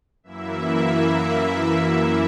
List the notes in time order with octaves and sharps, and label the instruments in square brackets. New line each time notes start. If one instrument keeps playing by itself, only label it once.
[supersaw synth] F#2 E3 A#3 E4 E5